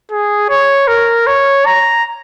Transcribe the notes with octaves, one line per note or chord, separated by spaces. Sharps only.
G#4
C#5
A#4
C#5
A#5